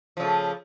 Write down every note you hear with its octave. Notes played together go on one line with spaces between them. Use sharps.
C#3 F3 A3